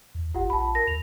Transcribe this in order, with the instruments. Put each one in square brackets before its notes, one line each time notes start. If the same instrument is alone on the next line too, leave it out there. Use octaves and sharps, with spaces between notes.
[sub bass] E2
[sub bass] G1 [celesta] F4 G4 F#5
[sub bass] A#1 [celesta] A5 B5
[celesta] A#4 A#6
[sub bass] D#2 [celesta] F7